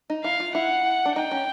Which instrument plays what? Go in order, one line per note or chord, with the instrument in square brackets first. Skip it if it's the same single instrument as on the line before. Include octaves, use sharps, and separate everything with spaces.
[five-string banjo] D#4
[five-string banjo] E4 [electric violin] F5
[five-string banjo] F4
[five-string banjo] E4 [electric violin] F#5
[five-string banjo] D4
[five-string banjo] D#4 [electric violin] G5
[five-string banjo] C#4